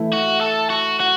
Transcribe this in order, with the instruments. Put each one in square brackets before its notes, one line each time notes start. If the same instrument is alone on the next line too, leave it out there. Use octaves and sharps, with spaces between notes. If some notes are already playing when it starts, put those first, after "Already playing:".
Already playing: [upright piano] E3 A3 E4
[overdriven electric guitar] F#4
A4
F#4
F#4